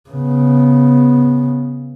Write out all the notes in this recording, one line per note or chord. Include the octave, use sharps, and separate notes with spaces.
C#3 B3